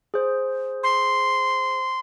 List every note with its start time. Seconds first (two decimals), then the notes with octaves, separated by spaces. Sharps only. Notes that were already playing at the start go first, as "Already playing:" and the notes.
0.14 G#4 C5
0.83 C6